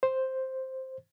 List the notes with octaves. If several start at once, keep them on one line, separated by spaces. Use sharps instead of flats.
C5